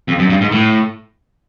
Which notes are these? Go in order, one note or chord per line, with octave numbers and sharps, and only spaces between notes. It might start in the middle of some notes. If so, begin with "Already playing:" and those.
F2
F#2
G2
G#2
A2